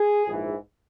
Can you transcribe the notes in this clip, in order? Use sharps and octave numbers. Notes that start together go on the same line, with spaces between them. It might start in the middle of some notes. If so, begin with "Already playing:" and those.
Already playing: G#4
A#1 G#2 E3